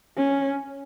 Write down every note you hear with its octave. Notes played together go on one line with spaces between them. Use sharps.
C#4